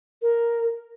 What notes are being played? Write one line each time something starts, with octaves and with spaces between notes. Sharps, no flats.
A#4